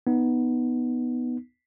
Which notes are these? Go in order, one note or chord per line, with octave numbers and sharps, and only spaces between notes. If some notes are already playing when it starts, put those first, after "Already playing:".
B3 D#4